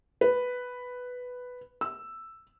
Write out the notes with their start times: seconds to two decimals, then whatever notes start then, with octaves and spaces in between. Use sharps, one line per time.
0.21 B4
1.81 E6